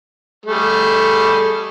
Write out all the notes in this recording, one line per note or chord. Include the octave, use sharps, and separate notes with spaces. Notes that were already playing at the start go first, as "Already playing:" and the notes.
G3 A3 G#4